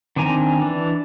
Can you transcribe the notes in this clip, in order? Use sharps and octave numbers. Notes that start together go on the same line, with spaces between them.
D#3 C4 D4 G#5 A#5
E3 D4